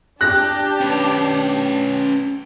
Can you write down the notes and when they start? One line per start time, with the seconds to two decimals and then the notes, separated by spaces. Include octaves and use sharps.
0.21 D4 G4 F#6 A#6
0.81 C#4 B4